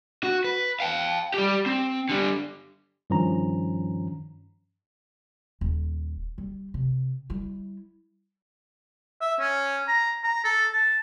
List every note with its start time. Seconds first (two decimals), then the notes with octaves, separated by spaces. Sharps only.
0.24 F#4
0.44 B4
0.80 F5 G5
1.34 G3 G4
1.66 C4
2.09 D3 G3
3.10 G2 D#3 F3 C#4 A#5
5.61 D#1
6.38 G3
6.74 C3
7.30 G3 E4
9.21 E5
9.39 C#4
9.88 A#5
10.24 A#5
10.44 A4
10.73 A5